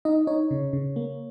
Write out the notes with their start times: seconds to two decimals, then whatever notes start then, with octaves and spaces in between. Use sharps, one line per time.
0.05 D#4 D#5
0.27 D#4 C#5
0.51 C#3
0.73 C#3
0.96 A#3